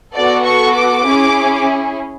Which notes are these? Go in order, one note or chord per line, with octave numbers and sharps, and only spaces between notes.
B3 F#4 A4 D5
C#6
D6
C#4 E4 G#4